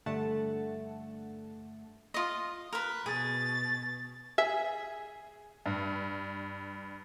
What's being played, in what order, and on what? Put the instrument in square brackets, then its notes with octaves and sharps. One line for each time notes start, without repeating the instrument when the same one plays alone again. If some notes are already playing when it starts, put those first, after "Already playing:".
[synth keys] G2 D3 A3 F#5 A5
[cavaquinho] F4 D#5
A#4 B4
[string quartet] B2 A6 [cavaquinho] G#4
[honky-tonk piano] G#4 [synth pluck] E5
[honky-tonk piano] G2